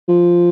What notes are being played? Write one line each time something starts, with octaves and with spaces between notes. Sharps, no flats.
F3